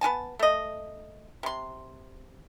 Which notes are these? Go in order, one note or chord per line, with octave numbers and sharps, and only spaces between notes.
B3 F#4 G#5 A5
A3 D#5
C3 C6